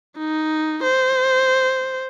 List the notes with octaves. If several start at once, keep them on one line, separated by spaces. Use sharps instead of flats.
D#4
C5